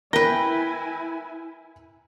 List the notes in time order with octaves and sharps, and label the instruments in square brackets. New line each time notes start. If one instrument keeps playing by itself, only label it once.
[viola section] E4 G#5 [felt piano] A#4 A#6 [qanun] B4 G5